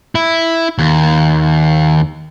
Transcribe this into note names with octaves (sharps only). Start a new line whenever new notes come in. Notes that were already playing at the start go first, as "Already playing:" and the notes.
E4
D#2